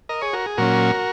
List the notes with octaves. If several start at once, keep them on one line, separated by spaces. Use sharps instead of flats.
A#4 D#5
G#4 C#5
F#4 A#4
G#4
A#2 F#3 C#4 F#4 A#4